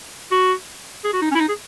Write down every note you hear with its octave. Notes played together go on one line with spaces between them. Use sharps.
F#4
G#4
F#4
D#4
C#4
E4
D#4
G#4